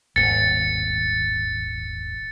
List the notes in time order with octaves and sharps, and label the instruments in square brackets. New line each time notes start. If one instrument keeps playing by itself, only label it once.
[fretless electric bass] D#1 G#1 [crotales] A6 C#7